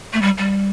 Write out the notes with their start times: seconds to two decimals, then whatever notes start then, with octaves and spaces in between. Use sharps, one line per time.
0.13 A3
0.22 G3
0.38 G3